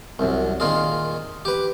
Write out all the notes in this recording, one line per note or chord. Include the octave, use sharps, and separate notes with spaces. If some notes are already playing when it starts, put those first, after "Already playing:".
C2 F#2
A#2 D#3 F4 G#4
G4 B4